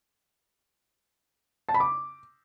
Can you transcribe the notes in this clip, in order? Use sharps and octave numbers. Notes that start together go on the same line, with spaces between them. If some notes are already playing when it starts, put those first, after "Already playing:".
A5
B5
D6